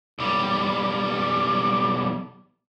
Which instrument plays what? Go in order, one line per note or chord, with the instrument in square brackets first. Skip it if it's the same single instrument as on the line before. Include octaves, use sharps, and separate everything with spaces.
[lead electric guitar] B1 G3